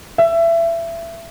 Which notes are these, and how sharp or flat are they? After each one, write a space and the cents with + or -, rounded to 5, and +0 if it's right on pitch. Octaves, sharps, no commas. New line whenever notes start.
E5 +25